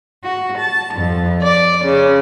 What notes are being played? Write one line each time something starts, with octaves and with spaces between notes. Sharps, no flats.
F#4
A5
F2
D5
C#3